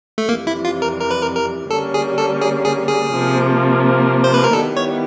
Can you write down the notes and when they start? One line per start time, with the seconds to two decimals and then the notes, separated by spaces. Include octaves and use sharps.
0.18 A3
0.29 F2 C3 E3 G3 A#3
0.47 E4
0.65 F4
0.82 A#4
1.00 A#4
1.11 B4
1.22 A#4
1.35 A#4
1.70 D3 G3 A#3 C#4 A4
1.94 G#4
2.18 A4
2.42 G#4
2.65 G#4
2.88 G#4
3.12 C3 F3 A#3
4.24 C5
4.34 B4
4.44 A#4
4.53 D#3 G3 B3 E4 G4 A4
4.77 C#5